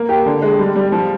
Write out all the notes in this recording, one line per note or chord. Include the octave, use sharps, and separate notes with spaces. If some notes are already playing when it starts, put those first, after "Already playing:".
Already playing: A#3
G4
D3
G#3
G3
G3
F3